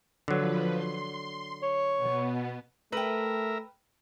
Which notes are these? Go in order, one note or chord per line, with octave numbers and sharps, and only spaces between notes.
D3 F3 F#3 B4
C6
C#5
B2 B3
A3 A#4 B4 E5 G5